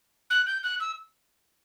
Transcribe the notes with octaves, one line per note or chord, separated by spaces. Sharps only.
F#6
G6
F#6
E6